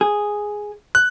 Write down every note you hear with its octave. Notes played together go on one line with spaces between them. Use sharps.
G#4
F#6